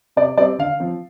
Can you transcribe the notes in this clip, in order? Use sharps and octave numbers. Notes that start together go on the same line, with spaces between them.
C3 D5
G3 C4 D5
D3 F5
F3 C4